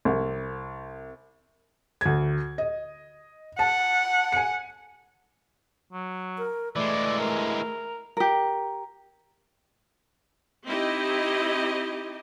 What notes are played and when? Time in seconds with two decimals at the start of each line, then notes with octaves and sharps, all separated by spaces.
0.05 C2
2.01 D2 G#6
2.58 D#5
3.59 F#5 A5
4.32 G#5 C#7
5.92 F#3
6.38 A#4
6.76 E3 G#3 A3 D5
7.20 A#4
8.17 G4 A#4
10.67 C4 D#4 E4 G4 D#5